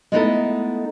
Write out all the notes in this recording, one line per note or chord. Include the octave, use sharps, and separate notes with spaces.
G#3 A3 B3 D#4 E4 A4